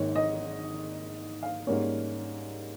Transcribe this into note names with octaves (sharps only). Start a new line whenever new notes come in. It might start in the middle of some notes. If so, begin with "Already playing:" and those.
Already playing: G#1 G#2 D#3 A#3 C#5
D#5
F5
G#2 G3 A#3 C#4